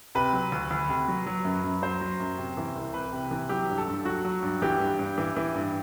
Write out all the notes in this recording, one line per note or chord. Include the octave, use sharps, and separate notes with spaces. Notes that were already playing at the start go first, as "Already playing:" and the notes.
C3 B4
F#3
D2
D2
C3
F#3
F#3
F#2
F#2
F#3 C5
F#3
F#2
C3
E3
C2
C2 B4
C3
E3
F#3 G4
G2
A4
G2
F#3 F#4
F#3
G2
E3 G4
G2
G2
E3
E3
G2